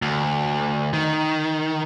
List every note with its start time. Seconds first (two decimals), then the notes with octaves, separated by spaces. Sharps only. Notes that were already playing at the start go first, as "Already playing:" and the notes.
0.02 D2
0.93 D#3